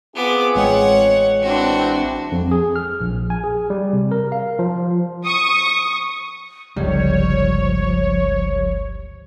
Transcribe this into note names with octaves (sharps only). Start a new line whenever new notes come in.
B3 C4 F4 G#4 D6
A1 G#3 C#5 F#5 G5
E3 C4 D4 F#4
F2
G#4
F6
A#1
G#5
G#4
G3
C3
A#4
F5
F3
C#6 D#6
G1 C#2 F3 G3 C#5